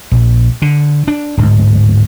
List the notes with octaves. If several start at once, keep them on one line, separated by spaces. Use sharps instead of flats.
A#1
D3
D4
D1 G#2